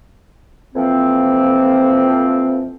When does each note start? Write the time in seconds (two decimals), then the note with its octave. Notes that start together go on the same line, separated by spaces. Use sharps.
0.74 F2 E3 F3 A#3 C4